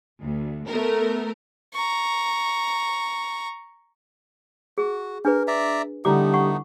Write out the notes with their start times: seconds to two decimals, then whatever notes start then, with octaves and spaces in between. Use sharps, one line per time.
0.20 D2
0.67 A3 B3 A#4
1.74 A#5 C#6
4.78 F#4 G#4
5.25 D4 G#4 A#4 B4
5.47 D5 E5 A#5
6.05 D3 G3 A3 B3 D#4 E4 D6
6.34 F#5 C#6